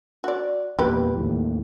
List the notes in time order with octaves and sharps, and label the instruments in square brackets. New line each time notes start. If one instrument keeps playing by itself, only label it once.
[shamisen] F#4 D5
[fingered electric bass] E2 A#2 [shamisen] G4 B4
[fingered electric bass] D#2 A2